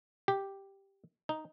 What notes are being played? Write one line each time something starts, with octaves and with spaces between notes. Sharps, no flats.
G4
D#4